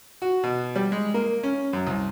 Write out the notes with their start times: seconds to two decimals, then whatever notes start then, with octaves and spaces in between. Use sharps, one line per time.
0.22 F#4
0.43 B2
0.76 G3
0.92 G#3
1.14 A#3
1.43 C#4
1.73 F#2
1.87 C2